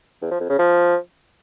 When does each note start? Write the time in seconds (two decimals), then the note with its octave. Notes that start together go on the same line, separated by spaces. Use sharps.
0.22 E2
0.31 F3
0.40 F2
0.49 C#3
0.59 F3